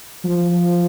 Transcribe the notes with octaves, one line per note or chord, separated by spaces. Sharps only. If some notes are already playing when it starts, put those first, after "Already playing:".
F3